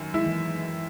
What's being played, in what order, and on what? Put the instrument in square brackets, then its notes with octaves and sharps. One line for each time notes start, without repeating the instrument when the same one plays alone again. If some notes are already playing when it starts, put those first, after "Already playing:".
Already playing: [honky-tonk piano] F#2 D#3
[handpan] G#3 [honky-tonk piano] E4
[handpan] E3